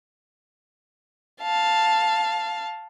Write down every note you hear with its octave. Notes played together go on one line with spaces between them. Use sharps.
F5 A5